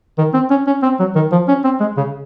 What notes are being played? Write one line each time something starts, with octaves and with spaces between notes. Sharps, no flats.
D#3
C4
C#4
C#4
C4
F#3
D#3
F3
C#4
C4
G#3
C#3